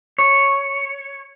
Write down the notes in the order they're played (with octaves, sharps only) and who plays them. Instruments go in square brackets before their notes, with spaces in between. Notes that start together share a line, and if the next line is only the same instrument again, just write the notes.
[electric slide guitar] C#5